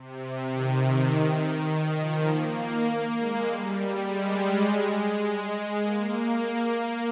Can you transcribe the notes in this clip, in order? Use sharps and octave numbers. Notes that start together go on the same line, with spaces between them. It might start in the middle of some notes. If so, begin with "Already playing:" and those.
Already playing: C3
D#3
D#3
F3
A#3
A#3
G#3
G3
G3
G#3
A#3